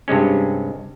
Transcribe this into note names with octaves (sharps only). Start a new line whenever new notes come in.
G2 C3 G#3 C#4